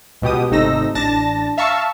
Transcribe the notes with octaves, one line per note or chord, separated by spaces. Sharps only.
C#2 B2 G4 D#6
G#1 C3 A3 D#4 E6 A#6
A1 D4 A5 A6 A#6
E5 F5 A5 A#5 C#6 E6